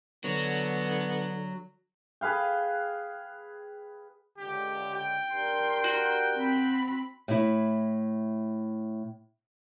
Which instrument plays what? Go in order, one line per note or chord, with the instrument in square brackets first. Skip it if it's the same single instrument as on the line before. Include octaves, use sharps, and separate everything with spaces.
[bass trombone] D3 [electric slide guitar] F#3 [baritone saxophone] B3
[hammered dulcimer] G#4 B4 F5 G5
[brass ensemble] C#2 D3 [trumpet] G4
[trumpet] G5
[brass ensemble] D4 G4 A#4 [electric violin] C6
[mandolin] F#4
[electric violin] C4 B5
[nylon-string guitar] A2 E4